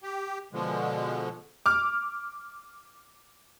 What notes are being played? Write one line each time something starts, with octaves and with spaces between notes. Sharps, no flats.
G4
B2 D3 F3 G#3
D6 F6